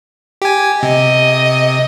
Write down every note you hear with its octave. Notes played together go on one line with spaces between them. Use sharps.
G4 G#5
C3 D#5